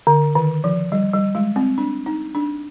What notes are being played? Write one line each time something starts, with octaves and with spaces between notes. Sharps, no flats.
D3
D#3
F3
G3
G3
G#3
C4
D4
D#4
D4